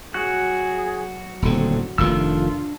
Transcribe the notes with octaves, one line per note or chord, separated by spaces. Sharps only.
F#3 F#4 G#4 F#6
D#1 A2 D3 C4
F1 A2 D#3 D4 F4 E6